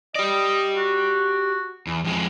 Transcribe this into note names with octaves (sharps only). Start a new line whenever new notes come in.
G4 D5 D#5
F#4
E2
F2 G#3